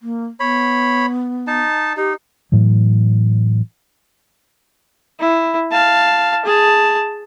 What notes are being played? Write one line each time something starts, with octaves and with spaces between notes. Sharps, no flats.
A#3
B3 C#5 B5
D#4 A5
D#4 G4
A2 E3 F#3
E4
F5 A5
G#4 A5